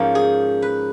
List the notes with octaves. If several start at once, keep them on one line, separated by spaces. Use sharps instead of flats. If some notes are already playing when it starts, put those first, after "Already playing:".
Already playing: G#2 F3 A#3 C#4
G#4
B4